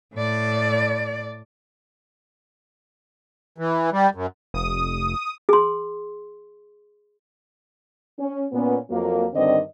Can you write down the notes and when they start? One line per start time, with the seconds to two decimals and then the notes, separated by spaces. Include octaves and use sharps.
0.14 A2 D5
3.58 E3
3.92 G3
4.15 F#2
4.54 F1 D#6
5.49 G#4 C6
8.19 C#4
8.52 A#2 B3 C#4
8.90 F2 F3 F#3 A#3
9.34 G2 D3 D#3 C4 D5 D#5